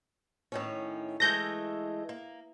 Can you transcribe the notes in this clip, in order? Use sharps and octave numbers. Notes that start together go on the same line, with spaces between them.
A2 D#3 C#4
E3 G#3 A3 G6 A#6
A#3